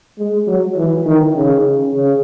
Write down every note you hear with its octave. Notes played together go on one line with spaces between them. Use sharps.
G#3
F#3
E3
D#3
C#3
C#3